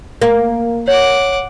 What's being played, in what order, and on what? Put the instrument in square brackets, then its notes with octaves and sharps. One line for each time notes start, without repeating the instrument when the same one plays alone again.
[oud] A#3
[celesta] C#5 [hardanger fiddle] F#5 D6